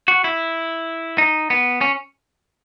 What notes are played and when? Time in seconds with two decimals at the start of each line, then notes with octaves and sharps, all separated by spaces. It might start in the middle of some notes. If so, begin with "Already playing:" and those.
0.08 F#4
0.24 E4
1.18 D#4
1.50 B3
1.81 C#4